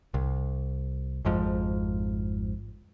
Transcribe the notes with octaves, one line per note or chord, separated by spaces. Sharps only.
C2
G#1 F2 G#2 F3